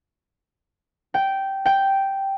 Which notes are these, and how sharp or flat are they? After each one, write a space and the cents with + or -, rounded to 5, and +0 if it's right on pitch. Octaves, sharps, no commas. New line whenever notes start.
G5 -10
G5 -5